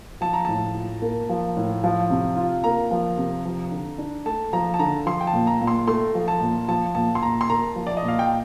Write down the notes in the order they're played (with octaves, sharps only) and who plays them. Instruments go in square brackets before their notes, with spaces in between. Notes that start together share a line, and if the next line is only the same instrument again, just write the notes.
[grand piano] F3 [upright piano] A5
[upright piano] A#5
[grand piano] A2 [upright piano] A5
[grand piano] F4
A#3
F3
A2
F3
C3
F4
[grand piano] A#3 [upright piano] A#5
[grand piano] F3
C3
F3
D3
D4
[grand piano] A3 [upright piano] A5
[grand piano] F3 [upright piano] A#5
[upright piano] A5
[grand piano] D3 [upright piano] A#5
[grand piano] F3 [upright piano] C6
[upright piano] G5
A5
[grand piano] A#2
[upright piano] A#5
[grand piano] A#2
[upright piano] C6
[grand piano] A3 [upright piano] C6
[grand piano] F3
[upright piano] A5
[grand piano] A#2
[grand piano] F3 [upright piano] A5
[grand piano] A#2 [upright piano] A5
[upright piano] C6
[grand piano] A#2 [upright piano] A#5
[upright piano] C6
[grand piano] A#3 [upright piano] A#5
[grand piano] F3
[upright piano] D5
D#5
[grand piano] A#2
[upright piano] F5
G5